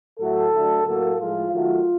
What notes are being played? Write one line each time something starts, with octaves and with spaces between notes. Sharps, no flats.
A2 F#3 A3 A4
D3 F#3 A3
A2 F#3 A#3 A4
A2 F3 G#3 F4
D#3 F#3 A3 F4